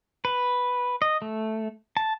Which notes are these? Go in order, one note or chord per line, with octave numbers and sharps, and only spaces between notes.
B4
D#5
A3
A5